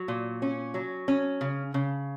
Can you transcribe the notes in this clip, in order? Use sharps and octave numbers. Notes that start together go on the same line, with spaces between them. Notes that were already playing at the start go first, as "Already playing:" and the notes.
Already playing: F#3
A#2
C#4
F#3
C#4
C#3
C#3